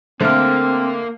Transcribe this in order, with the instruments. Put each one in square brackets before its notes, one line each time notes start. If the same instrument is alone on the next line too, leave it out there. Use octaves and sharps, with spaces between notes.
[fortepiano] D3 A3 [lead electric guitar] A#3 A#4 [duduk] C4 [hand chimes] C5 F6